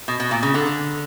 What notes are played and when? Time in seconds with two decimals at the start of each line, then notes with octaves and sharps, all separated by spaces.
0.08 B2
0.20 B2
0.31 A#2
0.43 C#3
0.54 D3